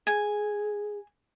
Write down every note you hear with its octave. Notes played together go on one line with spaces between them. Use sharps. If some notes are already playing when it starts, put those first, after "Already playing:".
G#4 G#5